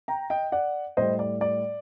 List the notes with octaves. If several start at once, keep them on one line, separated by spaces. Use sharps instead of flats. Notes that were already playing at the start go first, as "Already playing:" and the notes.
G5 A#5
D#5 G5
D5 F#5
A2 G3 C5 D#5
D5
D5